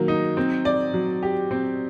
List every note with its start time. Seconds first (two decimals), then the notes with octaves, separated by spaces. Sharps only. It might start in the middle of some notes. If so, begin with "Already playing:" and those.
Already playing: D#3 F#3 A#3
0.08 D#4
0.37 C4
0.65 D5
0.94 F#3
1.23 G4
1.51 C4